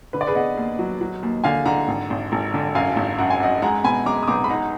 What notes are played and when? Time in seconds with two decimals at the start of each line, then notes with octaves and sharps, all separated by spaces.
0.13 D3 B4
0.21 D5
0.27 G#4 B4
0.35 B3 D#5 F#5
0.57 D#2
0.79 F#3
1.01 F#3
1.23 D#2
1.44 D3 F5 G#5
1.65 D3 F#5 A#5
1.88 G#1
2.10 G#1
2.32 G#1
2.54 D3
2.75 F#2 F5 G#5
2.96 G#1
3.18 F#2 F#5
3.30 G#5
3.40 F#2 D#5 F#5
3.62 G#3 F#5 A#5
3.84 B2 G#5 B5
4.06 G#3 A#5 D6
4.23 D#6
4.28 B1 A#5 D6
4.44 B5
4.49 D#4 F#5 A#5